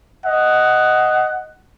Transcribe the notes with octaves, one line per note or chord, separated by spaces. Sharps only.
D#5 F#5